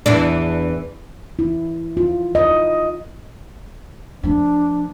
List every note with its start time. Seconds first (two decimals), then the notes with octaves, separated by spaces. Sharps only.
0.06 E2 E3 D4
1.39 E4
1.97 F4
2.35 D#5
4.23 F3 A3 D4